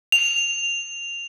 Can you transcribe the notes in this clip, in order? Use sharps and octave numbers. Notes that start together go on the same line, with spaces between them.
F7